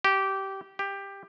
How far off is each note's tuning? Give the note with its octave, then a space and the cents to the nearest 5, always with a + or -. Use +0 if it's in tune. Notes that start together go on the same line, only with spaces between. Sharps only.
G4 -15
G4 +15